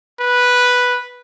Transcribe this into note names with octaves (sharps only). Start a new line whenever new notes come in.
B4